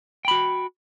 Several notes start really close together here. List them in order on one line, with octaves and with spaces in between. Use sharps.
G5 B5 F#4